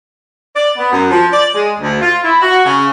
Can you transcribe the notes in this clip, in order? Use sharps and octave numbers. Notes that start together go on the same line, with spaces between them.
D5
B3
F#2
F3
D5
G#3
D2
F4
E4
F#4
C#3